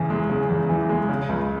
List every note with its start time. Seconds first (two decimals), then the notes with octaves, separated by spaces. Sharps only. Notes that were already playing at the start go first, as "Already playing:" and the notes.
Already playing: E2 C#3 E3
0.10 G#3
0.29 C#3
0.49 E2
0.69 E3
0.89 G#3
1.09 C#3
1.29 C#2